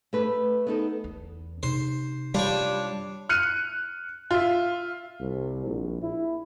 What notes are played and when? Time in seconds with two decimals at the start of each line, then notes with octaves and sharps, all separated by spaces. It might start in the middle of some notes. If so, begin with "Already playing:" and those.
0.13 A3 B4
0.67 B3 D#4 A4 A#4
1.04 E2
1.63 C3 D#4 C5
2.34 G3 D4 F4 C#5
3.29 F6 F#6 C#7 D#7
4.31 F4 E5
5.20 C2
5.66 A#1
6.02 E4